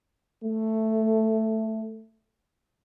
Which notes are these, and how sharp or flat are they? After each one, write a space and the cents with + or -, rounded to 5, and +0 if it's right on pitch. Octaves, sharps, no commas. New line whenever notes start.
A3 +5